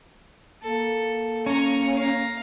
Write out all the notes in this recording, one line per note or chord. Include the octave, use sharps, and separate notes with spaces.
A#3 A4
C#4 A#5 C#6
F5 A#5